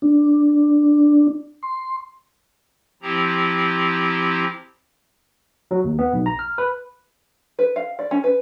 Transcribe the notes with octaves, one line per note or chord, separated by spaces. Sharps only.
D4
C6
F3 C4 E4 G4 A#5
F#3
D#2
B3
B1
A#5
F6
B4
B4
F5
D5
C#4
B4